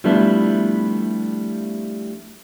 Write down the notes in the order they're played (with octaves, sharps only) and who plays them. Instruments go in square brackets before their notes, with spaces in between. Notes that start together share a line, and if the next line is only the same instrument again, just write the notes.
[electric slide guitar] F3 G3 A3 B3 D4 E4